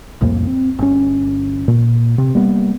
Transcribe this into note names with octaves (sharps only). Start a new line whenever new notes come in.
C2 F2 A2 A#3
C4
G1 C#4
A#2
C3
G3 A#3 B3